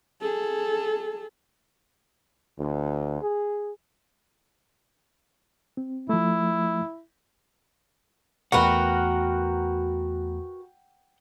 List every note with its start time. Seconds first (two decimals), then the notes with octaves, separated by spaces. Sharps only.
0.21 G#4 A4
2.58 D2
3.21 G#4
5.77 C4
6.09 F3 A3 E4
8.52 E2 A3 F#4 A#4 B4 F#5 G5 A#5